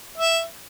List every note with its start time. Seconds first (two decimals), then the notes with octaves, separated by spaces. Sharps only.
0.18 E5